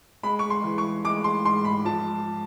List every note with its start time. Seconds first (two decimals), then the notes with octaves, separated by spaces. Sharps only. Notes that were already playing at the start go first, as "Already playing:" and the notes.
0.23 G#3 B5
0.39 C#6
0.50 C6
0.64 E3
0.78 C#6
1.04 G#3 D6
1.24 C6
1.45 G#2 C6
1.65 B5
1.85 F3 A5